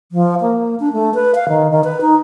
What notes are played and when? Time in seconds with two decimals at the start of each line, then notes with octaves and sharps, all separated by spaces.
0.12 F3
0.41 A#3
0.80 D4
0.93 A3
1.14 B4
1.35 F5
1.49 D#3
1.71 D#3
1.84 B4
2.01 D#4